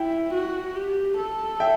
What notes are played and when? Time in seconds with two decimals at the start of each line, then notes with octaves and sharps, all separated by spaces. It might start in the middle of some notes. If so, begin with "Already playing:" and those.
Already playing: E4 E5 G5
0.33 F#4
0.75 G4
1.18 A4
1.60 E5 G5